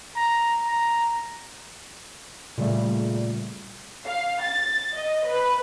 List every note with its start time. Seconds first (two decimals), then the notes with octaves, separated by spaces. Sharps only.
0.16 A#5
0.67 A#5
2.58 A#2 C#3 G3 A3
4.06 F5
4.42 A6
4.93 D#5
5.27 B4